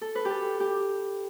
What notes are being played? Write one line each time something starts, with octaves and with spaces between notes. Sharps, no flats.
A4
B4
G4
A4
G4